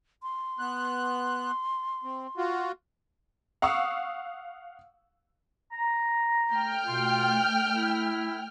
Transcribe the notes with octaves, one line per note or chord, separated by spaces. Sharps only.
C6
B3 F#6
C4
F4 F#4
F5 F#5 C#6 D#6 E6
A#5
A3 G5 F6
B2 F4
E4